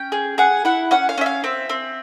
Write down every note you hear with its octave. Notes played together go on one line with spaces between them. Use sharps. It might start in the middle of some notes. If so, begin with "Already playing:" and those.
Already playing: C#4 G5
G#4
G#4 F#5
E4 F#5
C#4 F#5
F5
C#4 E5
F5
C4 E5
C4